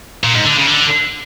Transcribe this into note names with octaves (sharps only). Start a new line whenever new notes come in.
A#2
G#2
D3
C#3
D3